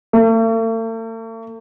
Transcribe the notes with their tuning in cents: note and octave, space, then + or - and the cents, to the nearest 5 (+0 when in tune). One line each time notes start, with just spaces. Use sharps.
A3 +45